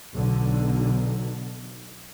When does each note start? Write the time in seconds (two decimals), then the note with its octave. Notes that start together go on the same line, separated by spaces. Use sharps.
0.13 B1 D3